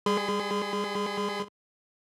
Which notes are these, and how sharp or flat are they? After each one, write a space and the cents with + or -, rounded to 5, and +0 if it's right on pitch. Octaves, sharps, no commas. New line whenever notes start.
G3 +25 G#4 +0 C6 -45